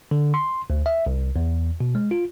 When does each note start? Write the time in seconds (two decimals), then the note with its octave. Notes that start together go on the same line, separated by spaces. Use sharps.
0.11 D3
0.34 C6
0.70 D2
0.86 E5
1.06 C2
1.36 E2
1.80 B2
1.95 G#3
2.11 F4